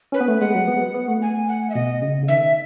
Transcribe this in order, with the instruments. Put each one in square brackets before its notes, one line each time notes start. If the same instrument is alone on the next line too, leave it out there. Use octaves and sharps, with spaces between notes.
[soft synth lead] C#4 [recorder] B4
[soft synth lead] B3
A3
[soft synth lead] G#3 [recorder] F#5
[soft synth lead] F#3
B3
B3
B3
A3
[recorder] G#5
F#5
E5
[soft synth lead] B2 [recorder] D#5
[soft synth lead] C#3
C#3
[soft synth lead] D#3 [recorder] E5